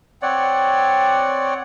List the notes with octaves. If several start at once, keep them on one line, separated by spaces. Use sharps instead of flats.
C4 C#5 D5 F#5